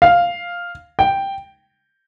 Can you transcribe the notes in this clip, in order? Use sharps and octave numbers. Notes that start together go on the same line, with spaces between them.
F5
G5